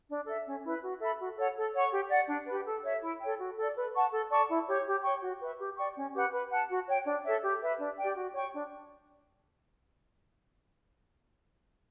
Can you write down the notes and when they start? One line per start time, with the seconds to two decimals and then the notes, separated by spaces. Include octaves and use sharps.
0.09 D4
0.26 A4 E5
0.45 C#4
0.63 E4 B4
0.82 F#4
1.00 A4 E5 B5
1.18 F#4
1.37 A4 C#5 F#5
1.56 A4
1.74 C#5 F#5 C#6
1.92 G4
2.10 D5 F#5
2.28 D4
2.46 G4 B4
2.65 A4
2.84 C#5 E5
3.02 E4
3.20 A4 C#5 G5
3.39 F#4
3.57 A4 D5
3.75 B4
3.94 F#5 A5 C#6
4.12 A4
4.30 D5 A5 C#6
4.48 E4
4.67 G4 C#5
4.86 G4
5.04 C#5 G5 C#6
5.22 F#4
5.41 B4 E5
5.59 G4
5.77 D5 G5 C#6
5.95 C#4
6.14 G4 B4 F#5
6.32 B4
6.50 F#5 A5
6.69 F#4
6.87 C#5 G5
7.06 D4
7.24 A4 C#5 E5
7.42 G4
7.61 B4 E5
7.79 D4
7.98 G4 D5 G5
8.16 F#4
8.34 C#5 G5 C#6
8.53 D4